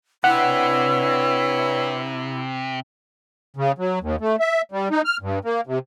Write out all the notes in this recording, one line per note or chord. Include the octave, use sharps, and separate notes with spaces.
C3 D4 E4 B4 C#5 F#5
C#3
F#3
D#2
A3
E5
G3
D#4
F6
G2
A#3
C3